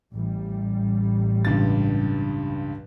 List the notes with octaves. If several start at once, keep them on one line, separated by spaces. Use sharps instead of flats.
A1 G3
C#2 G2 A6